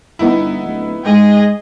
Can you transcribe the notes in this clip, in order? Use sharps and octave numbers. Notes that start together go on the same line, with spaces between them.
G1 B3 D#4 E4
D1
G#2 G#3 G#4 D#5